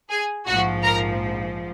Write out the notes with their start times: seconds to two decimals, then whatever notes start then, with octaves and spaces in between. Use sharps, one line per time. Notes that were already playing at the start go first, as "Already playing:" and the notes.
0.10 G#4 G#5
0.47 A#1 G#2 F3 F#4 F#5
0.84 A#4 A#5